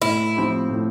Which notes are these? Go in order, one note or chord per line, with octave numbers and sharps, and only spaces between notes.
A2 E4
F3 C4 G4
A2